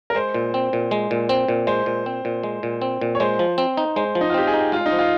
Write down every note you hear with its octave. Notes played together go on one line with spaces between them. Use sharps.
A#4
G#3 C5
A#2
C4
A#2
G#3
A#2
C4
A#2
G#3 C5
A#2
C4
A#2
G#3
A#2
C4
A#2
C#5
G#3 C5
F3
C4
D#4
G#3 C5
F3
D#4
F4
C4 G4
G#4
D#4
G#3 F4
D#4
F3
F4